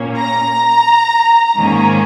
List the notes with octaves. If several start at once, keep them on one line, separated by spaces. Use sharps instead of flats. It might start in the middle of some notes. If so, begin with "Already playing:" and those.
Already playing: A#2 A#3 C#4
A#5
G#2 D#3 A#3 C#4